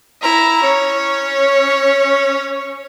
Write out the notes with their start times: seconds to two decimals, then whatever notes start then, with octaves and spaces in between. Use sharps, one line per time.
0.22 E4 A#5
0.63 C#4 C#5